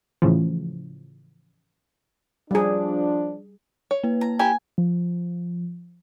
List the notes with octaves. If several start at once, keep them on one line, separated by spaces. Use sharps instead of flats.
A2 C#3 E3 F3
F3 G3 D4 G#4
C#5
A#3 B4
A#5
E4 G4 G#5 A#5
F3